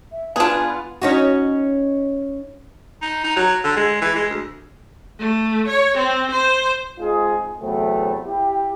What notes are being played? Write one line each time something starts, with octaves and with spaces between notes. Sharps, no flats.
E5
B3 D4 F4 G#4 G#5
C#4 D#4 F#4
D#4
D#4
F#3
D3
G#3
E3
G#3
D2
A3
C#5
C4
C5
G#3 C4 D#4 F4 G#4
E2 C3 F#3 A3 B3 C4
E4 G4